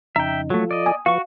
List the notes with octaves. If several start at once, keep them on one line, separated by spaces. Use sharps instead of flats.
F2 C#3 D#4 E5 G5 A#5
F3 F#3 A3 F4 A4
D5 D#5
G#5 D#6
F3 F#4 B4 F5 C#6